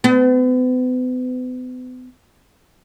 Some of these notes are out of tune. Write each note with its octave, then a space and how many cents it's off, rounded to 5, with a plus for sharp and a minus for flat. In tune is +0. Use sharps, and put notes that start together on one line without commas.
B3 +40